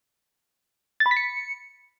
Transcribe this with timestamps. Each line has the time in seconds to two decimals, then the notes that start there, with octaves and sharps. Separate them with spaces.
1.00 A6
1.06 B5
1.11 B6
1.17 C#7